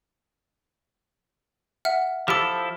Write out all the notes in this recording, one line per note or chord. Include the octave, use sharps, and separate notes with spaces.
E5 F#5 F6
F3 E4 G4 A4 D6